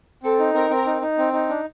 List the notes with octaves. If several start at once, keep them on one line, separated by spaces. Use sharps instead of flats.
C4 A4
D#4
C4 A#4
C4
D#4
D#4
C4
D#4
D4